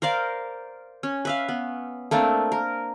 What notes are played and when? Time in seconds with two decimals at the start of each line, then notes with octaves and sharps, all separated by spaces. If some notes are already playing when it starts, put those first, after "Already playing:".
0.02 A#4 C5 D5 F5
1.03 C#4
1.25 B4 E5 F5
1.49 B3
2.11 A3 A#3 C4 D4
2.52 A#4